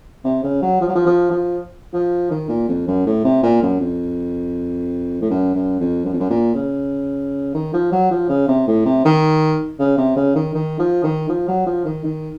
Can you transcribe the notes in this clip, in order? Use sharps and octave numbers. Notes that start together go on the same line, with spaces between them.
C3
C#3
F#3
F3
F#3
F3
F3
F3
F3
D#3
A#2
F2
F#2
A2
C3
A#2
F#2
F2
A2
F#2
F#2
F2
F#2
F2
F#2
A#2
C#3
D#3
F3
F#3
F3
C#3
C3
A2
C3
D#3
C#3
C3
C#3
D#3
D#3
F3
D#3
F3
F#3
F3
D#3
D#3